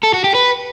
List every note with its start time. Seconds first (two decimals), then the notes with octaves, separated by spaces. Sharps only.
0.03 A4
0.14 F#4
0.24 G4
0.35 B4